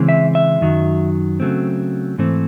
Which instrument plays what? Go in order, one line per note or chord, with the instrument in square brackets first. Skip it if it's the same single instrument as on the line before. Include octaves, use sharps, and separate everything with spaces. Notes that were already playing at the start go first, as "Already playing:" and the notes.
Already playing: [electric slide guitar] C#3 E3 G#3 C4
E5
E5
F#2 D#3 F#3
C#3 F#3 A3 C4
G#2 E3 A3 C4